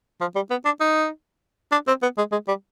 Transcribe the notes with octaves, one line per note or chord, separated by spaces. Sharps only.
F3
G3
B3
D4
D#4
D4
C4
B3
G#3
G#3
G3